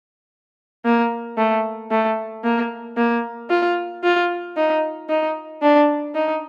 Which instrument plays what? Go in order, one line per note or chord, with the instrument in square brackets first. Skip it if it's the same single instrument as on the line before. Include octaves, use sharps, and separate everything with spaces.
[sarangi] A#3
A3
A3
A#3
A#3
F4
F4
D#4
D#4
D4
D#4